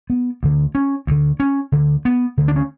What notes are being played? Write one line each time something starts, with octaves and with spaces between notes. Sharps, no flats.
B3
D2 D3
C#4
D2 D3
C#4
D2 D3
B3
D2 D3
D4
C#4